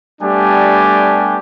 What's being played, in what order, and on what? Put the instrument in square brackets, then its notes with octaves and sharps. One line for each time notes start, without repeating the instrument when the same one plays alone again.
[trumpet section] G3 A3 B3 D4 G4 G#5